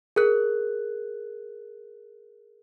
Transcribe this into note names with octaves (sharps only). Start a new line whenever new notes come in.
G#4 A#4 F#6